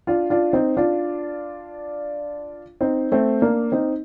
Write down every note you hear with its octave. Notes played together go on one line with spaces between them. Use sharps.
D4 F4
D4 F4
C4 D#4
D4 F4
C4 D#4
A3 C4
A#3 D4
C4 D#4